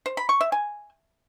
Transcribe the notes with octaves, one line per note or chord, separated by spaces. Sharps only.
C5
B5
C#6
E5
G#5